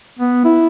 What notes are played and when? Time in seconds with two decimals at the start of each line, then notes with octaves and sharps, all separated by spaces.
0.19 B3
0.45 E4